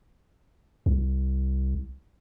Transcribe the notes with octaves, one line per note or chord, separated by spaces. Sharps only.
C2